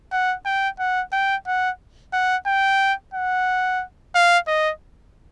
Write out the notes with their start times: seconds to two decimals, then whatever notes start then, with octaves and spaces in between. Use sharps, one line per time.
0.12 F#5
0.45 G5
0.79 F#5
1.12 G5
1.47 F#5
2.13 F#5
2.46 G5
3.14 F#5
4.15 F5
4.48 D#5